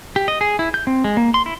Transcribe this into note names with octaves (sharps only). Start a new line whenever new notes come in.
G4
D#5
G#4
E4
G6
C4
G#3
A#3
C6
E4